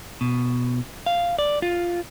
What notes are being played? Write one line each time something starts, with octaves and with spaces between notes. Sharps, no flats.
B2
F5
D5
F4